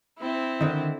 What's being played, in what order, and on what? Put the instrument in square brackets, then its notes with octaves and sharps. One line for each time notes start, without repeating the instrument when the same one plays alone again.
[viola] C4 E4
[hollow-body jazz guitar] D3 D#3